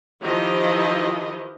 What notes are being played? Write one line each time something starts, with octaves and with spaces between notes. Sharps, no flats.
D#3 F3 E4 G4 B4 D#5